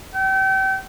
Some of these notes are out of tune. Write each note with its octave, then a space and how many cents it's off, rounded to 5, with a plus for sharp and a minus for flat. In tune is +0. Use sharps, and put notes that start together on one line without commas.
G5 -35